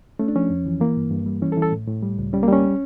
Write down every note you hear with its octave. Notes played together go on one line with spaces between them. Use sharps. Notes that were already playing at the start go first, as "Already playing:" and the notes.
A3 C#4
D4
F3 C#4
F2
E3
E3 A#3
G2
G2
G3
E3 C#4
A4
E3
A4
A2
A2
G3
C#2
G3 C#4
A#3
G3 C#4